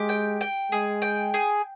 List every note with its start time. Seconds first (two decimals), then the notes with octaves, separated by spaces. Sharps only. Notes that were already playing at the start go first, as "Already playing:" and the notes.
Already playing: G#3 G4
0.09 G5
0.41 G5
0.71 G#3 G#4
1.02 G5
1.34 G#4